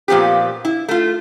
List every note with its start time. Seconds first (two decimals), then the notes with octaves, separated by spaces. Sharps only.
0.08 A#2 F3 B3 C4 G4
0.65 E4
0.88 A3 F4